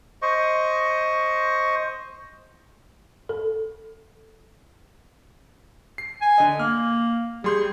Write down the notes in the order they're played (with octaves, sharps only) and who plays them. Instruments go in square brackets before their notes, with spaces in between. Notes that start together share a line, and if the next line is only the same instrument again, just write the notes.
[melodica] C5 D#5 C#6
[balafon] A4
[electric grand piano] C7
[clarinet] G#5
[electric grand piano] D3 D#5
[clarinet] A#3 [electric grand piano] F6
[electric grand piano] G3 C6 G6 [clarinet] G#4